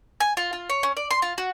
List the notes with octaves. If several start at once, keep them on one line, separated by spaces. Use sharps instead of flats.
G#5
F4
F4
C#5
C#4
D5
C6
F4
F#4